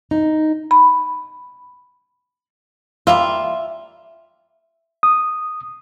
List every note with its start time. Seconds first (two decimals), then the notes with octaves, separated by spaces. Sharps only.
0.11 D#4
0.71 B5
3.07 G3 A#3 F4 E5
5.03 D#6